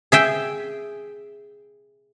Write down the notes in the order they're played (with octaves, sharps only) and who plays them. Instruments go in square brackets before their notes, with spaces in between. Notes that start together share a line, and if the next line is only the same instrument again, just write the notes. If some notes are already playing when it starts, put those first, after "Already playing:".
[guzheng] G#4 E5 G5 G#5